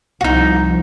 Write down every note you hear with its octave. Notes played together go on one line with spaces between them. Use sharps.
C2 F3 D#4 F#4